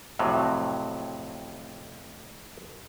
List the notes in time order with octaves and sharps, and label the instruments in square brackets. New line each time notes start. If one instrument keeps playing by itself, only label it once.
[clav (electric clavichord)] F2 A2 C3 F#3